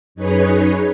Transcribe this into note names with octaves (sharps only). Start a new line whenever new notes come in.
F#2 D#4 G#4 B4 C#5